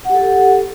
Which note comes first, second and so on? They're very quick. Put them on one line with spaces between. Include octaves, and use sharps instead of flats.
F#5 G4 A4